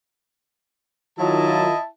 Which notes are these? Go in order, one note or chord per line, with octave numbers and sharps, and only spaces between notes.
D#3 F#3 E4 F4 D#5 A5